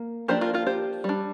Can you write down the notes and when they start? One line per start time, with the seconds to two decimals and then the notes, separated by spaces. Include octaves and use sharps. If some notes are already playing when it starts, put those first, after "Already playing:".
Already playing: A#3
0.28 F3 A#3 D4 G4 C5
0.41 F4 A#4
0.54 F4 A#4
0.66 G4 C5
1.04 G3 D4